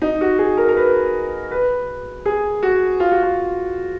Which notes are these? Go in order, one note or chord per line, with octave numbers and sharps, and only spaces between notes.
D#4
F#4
G#4
A#4
A#4
B4
B4
G#4
F#4
F4
F#4
F4